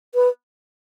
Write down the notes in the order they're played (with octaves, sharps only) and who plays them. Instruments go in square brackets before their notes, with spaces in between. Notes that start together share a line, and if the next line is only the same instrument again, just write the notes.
[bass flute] B4